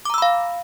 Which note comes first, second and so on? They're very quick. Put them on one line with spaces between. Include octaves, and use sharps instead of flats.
D6 A#5 E6 B5 F5